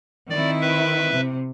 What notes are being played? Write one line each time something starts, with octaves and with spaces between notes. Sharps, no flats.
D#3 C4 E4 D5
B4 E5
C3